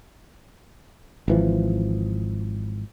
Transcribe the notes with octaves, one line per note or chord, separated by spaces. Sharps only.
G#1 E3 F3